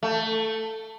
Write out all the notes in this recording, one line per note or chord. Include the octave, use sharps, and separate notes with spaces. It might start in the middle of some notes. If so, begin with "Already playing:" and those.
A3